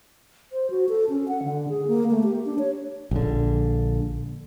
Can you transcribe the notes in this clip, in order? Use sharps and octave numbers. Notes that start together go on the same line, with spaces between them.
C5
F#4
A4
C#4
F#5
D3
G#4
A#3
A3
G4
D4
C#5
A#1 D3